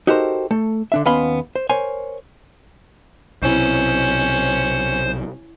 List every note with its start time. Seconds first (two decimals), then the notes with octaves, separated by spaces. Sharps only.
0.07 D#4 F#4 G4 A4 A#4 C5
0.51 A3 A4
0.92 D3 D4 E5
1.05 D#2 B3 C#4 F5 B5 C6
1.56 C5
1.70 A#4 C5 C#5 G#5
3.42 B1 C3 C#4 E4 C5 D#5 C#6